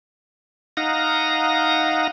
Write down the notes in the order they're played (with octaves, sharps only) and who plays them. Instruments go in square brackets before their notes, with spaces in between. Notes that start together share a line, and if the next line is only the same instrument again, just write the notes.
[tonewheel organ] D#4 F5 F#5 A#5 D#6 A#6